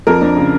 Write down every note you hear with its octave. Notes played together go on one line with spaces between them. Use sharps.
F2 A#4
F2 D4
C#3